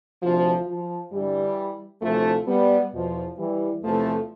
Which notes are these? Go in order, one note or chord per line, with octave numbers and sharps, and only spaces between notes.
D2 C3 E3 F3
F3
G2 D3 E3 G3
D2 C3 E3 F3 A3
G3 B3
E2 B2 F3
E3 G3
E2 C3 E3 F3 A3